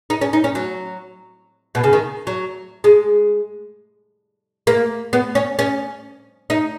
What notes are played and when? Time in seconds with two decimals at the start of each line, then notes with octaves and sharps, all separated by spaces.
0.10 D#4
0.21 C#4
0.33 D#4
0.44 C#4
0.55 F#3
1.75 B2
1.84 C#3
1.93 D#3
2.27 F#3
2.84 G#3
4.67 A#3
5.13 B3
5.35 C#4
5.59 C#4
6.50 D#4